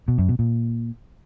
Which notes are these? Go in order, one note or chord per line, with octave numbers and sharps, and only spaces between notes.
B2
F#2
B2
A#2